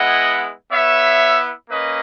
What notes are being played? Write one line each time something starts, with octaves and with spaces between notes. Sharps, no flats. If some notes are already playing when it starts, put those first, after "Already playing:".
Already playing: G#3 B3 E4 D#5 F#5
B3 E4 C#5 E5
A#3 C#4 B4 D#5